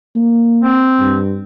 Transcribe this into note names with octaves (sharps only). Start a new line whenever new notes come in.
A#3
C4
G2